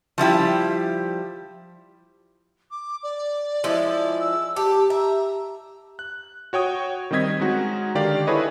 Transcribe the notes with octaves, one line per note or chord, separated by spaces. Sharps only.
F3 G3 E4 G4
D6
D5
F3 G#3 E4
E6
G4 A5
E5 A#5
F#6
F#4 C#5 G5 D#6
D#3 G3 C4 D#5 G#6 B6
G#3 C#4 D#4 F#4
D3 D#3 D4 G4 D5 F5
E4 G#4 A4 B4 C#5 D#5